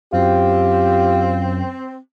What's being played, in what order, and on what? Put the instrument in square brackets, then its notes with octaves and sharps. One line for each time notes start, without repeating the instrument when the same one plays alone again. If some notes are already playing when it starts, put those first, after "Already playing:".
[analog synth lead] F#2 [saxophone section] C4 [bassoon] F4 [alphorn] G4